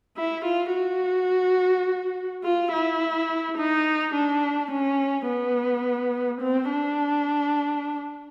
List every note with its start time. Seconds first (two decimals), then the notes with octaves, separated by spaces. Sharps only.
0.17 E4
0.45 F4
0.74 F#4
2.44 F4
2.72 E4
3.58 D#4
4.14 D4
4.71 C#4
5.28 B3
6.41 C4
6.70 D4